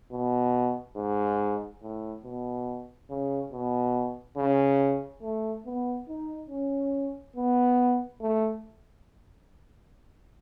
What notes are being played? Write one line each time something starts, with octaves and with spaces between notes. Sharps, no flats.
B2
G#2
A2
B2
C#3
B2
C#3
A3
B3
D#4
C#4
B3
A3